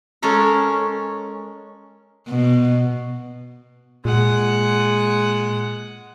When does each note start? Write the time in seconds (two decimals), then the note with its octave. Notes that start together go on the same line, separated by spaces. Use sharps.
0.22 G#3 C#4 A4 A#4
2.29 B2
4.05 A#2 G#3 F#5